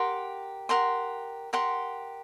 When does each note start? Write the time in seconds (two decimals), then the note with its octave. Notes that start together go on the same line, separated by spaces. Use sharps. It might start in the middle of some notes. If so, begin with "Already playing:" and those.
Already playing: G4 A#4 F#5 C6
0.69 G4 A#4 F#5 C6
1.53 G4 A#4 F#5 C6